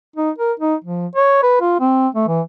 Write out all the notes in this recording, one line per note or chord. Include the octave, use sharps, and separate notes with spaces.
D#4
A#4
D#4
F3
C#5
B4
F4
C4
A3
E3